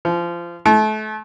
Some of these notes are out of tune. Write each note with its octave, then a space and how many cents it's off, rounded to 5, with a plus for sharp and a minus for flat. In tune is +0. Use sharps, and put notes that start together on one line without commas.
F3 -20
A3 -35